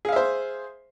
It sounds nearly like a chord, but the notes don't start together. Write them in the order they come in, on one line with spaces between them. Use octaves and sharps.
G#4 F5 E5 C5